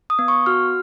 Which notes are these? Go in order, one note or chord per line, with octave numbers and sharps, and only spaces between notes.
D#6
B3
C#6
F#4 F6